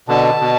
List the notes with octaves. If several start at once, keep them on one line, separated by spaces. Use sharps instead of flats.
B2 D3 A5
B2